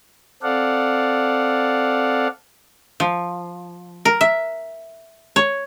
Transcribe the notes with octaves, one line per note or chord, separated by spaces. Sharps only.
C4 A4 D5 F5 F#5
F3
A#4
E5
C#5